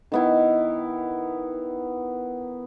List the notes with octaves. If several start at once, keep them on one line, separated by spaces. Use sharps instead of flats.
D#3 B3 E4